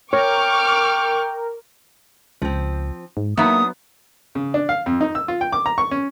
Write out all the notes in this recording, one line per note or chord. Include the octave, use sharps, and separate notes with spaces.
A#4 C#5 G5 C#6 D6 F6
C#2 F3 C4
G#2
F#3 A#3 B3 D4 D#4 E5 D#6
C#3
D4
F5
F2
D#4
E6
F4
G5
D6
A#5
C#6
C#4